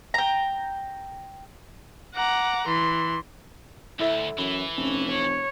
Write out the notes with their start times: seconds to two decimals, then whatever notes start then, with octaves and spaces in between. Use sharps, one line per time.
0.14 G5 A#5
2.13 F#5 A#5 D6
2.66 E3 C6
3.99 D2 E4 A4 E5
4.38 F#2 E3
4.77 F1 C#4
5.12 C#5